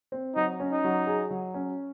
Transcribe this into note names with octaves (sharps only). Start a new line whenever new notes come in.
C4
F#3 D#4
C#4
D#4
F#3
G#4
F#3
C#4